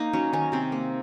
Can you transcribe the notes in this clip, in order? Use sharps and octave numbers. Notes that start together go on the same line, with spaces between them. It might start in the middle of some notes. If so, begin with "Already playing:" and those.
Already playing: A#3 D#4
F#3 C#4
D#3 C#4
C3 C4
A#3